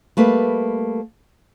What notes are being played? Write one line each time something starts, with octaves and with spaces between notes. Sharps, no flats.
G3 A3 A#3 B4